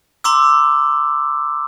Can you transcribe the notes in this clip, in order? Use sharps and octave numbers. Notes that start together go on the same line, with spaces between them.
A#5 C6 D6 E6